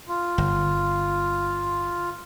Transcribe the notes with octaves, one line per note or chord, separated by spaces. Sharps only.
F4
G1